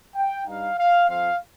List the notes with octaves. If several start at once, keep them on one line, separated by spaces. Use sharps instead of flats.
G5
G2 G3 D#4 F5
F5
F2 F3 C4 F5